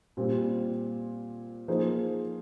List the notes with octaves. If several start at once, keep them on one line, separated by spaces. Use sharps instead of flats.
A#2 G3 C4
F3 A#3 D#4 G#4 C5